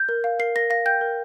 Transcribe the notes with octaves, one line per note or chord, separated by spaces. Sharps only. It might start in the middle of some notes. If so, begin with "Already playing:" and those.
Already playing: G6
A#4
F5
A#4 C7
A#4 A#6
F5 A#6
G5 G6
A#4